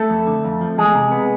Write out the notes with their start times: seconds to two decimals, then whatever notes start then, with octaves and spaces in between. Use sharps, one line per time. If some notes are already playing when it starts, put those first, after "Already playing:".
Already playing: A3 A4
0.10 F2
0.27 D3
0.44 F2
0.61 F3
0.78 E2 G#3 G#4
0.95 C3
1.11 B3